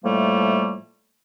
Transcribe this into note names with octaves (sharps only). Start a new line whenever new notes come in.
A2 F3 G3 A3 A#3